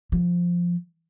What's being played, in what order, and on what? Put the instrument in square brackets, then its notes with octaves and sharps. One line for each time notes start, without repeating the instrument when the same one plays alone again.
[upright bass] F3